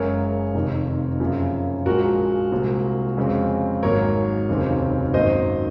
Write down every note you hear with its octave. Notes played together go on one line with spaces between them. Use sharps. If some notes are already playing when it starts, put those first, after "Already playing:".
Already playing: F#1 F#2 C#3 G#3 A#4 C#5
F1 F2 C3 D#3
F#2 C#3 F3 A#3
A#1 A#2 F3 G#3 F#4 A#4
C2 A#2 G#3 C4
F2 C#3 G#3 C4
G#1 G#2 F#3 A#3 A#4 C#5
F1 D#2 C#3 F#3 C4
G#1 F#2 D#3 F#3 A#3 C5 D#5